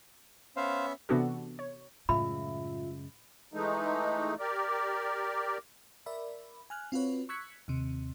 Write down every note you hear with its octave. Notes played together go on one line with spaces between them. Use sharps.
B3 C#4 C5 E5 F5
C3 E3 B3 D4 F#4 A4
C#5
F#2 A2 C#3 G#3 F4 E5 B5
E3 G#3 A3 D#4
G4 A#4 D5
A#4 D5 E5 B5
G#5 F6 F#6
C4 F4 F#4 B4 C#5
C#6 E6 F#6 G#6 B6 C#7
D#2 C3